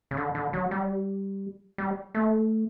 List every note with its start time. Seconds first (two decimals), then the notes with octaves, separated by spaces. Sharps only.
0.11 C#3
0.17 D3
0.35 D3
0.53 F#3
0.71 G3
1.78 G3
2.15 A3